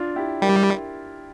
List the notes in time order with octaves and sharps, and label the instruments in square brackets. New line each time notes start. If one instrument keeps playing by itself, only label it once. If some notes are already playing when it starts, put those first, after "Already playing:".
Already playing: [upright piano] D4 F4
E4 G4
[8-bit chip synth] G3 [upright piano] G4 A#4